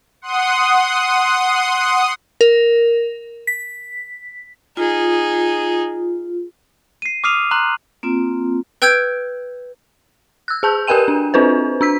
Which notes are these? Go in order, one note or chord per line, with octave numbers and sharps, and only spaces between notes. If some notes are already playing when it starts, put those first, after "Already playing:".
F#5 C6 D#6
A#4
B6
D#4 F4 G#4
C7 D#7
D6 D#6 F6 C7 D#7 F7
A#5 C6 F#6 F#7
A#3 C4 F4
B4 G5 E6 G6 G#6 D7
E6 F#6
G#4 A5 G6
G4 A#4 B4 G5 G#5 D#7
D4
C4 D4 F4 B4 C5
D4 E6 B6